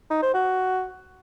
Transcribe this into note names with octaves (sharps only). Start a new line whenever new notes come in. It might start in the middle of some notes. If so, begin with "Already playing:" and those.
D#4
C5
F#4